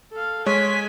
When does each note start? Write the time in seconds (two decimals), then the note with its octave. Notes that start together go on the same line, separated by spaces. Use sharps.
0.12 A4 F5
0.46 G#3 C#5 G#5 B6